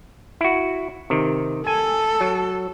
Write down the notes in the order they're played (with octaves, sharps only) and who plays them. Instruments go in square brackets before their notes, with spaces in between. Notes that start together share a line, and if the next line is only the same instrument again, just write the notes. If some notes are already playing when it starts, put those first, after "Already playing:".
[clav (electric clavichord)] E4 F#4
C3 D#3
[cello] A4 [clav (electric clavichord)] G#5
[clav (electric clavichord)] F#3